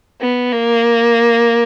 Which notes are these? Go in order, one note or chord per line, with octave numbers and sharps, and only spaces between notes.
B3
A#3